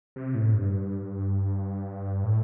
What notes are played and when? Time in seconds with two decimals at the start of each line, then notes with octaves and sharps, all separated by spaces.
0.16 C3
0.35 A2
0.53 G2
2.24 A2